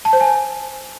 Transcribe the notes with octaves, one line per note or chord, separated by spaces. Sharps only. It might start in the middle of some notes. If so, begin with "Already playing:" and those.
A5
C5
G#5